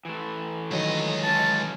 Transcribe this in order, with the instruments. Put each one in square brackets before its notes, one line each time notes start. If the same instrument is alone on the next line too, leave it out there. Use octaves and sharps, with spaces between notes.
[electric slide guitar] E3 A3
[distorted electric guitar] C#2 D#5 [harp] D#3 F#3
[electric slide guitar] E3 C#4 [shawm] A5